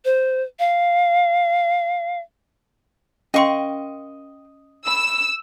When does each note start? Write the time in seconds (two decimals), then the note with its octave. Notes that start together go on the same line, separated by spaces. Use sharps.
0.05 C5
0.59 F5
3.34 C#4 A#4 D#5 F5 G5 C6 C#6
4.87 B5 E6